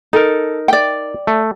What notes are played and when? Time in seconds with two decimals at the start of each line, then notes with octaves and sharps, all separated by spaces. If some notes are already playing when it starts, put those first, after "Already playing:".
0.13 D#4 A4 A#4
0.68 D5 G5
1.27 A3